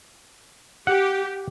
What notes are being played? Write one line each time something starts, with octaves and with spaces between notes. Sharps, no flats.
G4 F#5